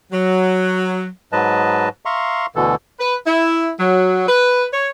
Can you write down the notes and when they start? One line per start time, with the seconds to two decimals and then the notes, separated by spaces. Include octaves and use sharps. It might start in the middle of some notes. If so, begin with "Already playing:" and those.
0.12 F#3
1.32 G#2 F#3 B4 D#5 A5
2.05 E5 F5 A#5 C6 C#6
2.56 D2 B2 D3 E3 A4
2.99 B4
3.26 E4
3.80 F#3
4.27 B4
4.73 C#5